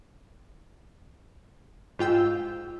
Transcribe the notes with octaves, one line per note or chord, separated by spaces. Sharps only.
G#2 F4 G5 E6